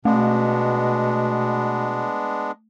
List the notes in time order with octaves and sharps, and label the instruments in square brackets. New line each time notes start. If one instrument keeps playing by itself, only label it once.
[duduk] B2 [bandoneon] G#3 B3 D4 [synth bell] A3